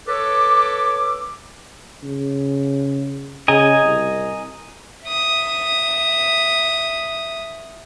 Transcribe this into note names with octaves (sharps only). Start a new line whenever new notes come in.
A4 B4 C#5 D6
C#3
C#3 D#5 G#5 A#5
C2
E5 D#6